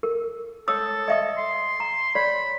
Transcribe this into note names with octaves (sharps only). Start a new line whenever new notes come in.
A#4
A4 C#5 D#6 E6
D#5 E5 D#6
C6
A#5
C#5 D5 B5